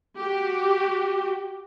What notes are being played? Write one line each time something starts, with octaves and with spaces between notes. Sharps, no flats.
F#4 G4